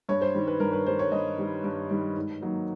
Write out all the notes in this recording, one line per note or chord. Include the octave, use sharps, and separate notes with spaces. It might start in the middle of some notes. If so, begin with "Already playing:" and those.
G2 C#5
C5
D#3 G3
B4
G2 A#4
B4
D#3 G3 C5
C#5
G2 D#5
D#3 G3
G2
D#3 G3
G#2
D#3 F#3 A#3 D#4